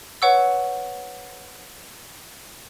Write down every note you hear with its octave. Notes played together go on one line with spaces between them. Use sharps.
B4 C#5 F#5 C#6 E6